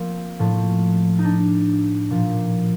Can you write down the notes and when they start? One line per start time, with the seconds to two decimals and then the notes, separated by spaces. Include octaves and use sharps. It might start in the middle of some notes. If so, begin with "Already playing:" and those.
Already playing: F3 A#3 C4
0.39 A2 F3
1.19 D#4
1.25 D4
2.10 A#2 F3